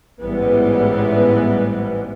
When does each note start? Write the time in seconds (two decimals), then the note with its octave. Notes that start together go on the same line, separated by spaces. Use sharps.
0.20 A1 G#2 E3 G3 G#3 B3